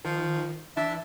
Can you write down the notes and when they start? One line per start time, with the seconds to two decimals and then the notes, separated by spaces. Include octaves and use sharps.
0.05 D#3 F3
0.77 E3 D4 E5